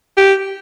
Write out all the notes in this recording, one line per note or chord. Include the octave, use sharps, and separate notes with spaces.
G4